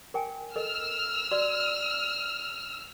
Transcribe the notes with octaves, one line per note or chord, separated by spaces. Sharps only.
A#4 G5 G#5
A4 A#4 D#5 E6 F6
F#4 D5